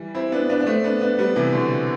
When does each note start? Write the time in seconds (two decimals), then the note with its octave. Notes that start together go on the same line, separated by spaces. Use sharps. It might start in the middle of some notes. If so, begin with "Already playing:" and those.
Already playing: E3 G3
0.15 C4 E4
0.32 B3 D4
0.50 B3 D4
0.60 D4
0.66 A3 C4
0.84 B3 D4
1.01 B3 D4
1.18 G3 B3
1.36 C3 E3
1.53 B2 D3